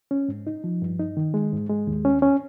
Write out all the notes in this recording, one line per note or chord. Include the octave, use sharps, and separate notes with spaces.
C#4
G#2
D#4
F3
G2
D#4
D#3
G#3
G#2
G#3
D#2
C#4
C#4